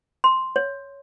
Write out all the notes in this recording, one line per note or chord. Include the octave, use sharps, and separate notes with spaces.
C6
C#5